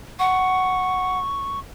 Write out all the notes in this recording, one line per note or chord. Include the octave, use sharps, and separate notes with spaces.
F#5 C#6